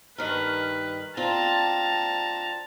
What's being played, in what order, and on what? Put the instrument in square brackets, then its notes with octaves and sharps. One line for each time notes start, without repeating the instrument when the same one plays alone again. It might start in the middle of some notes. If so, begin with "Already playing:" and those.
[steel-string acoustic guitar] G2 D#3 A#4 [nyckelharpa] B4
[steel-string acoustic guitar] C4 D4 F4 [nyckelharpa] A5 A#5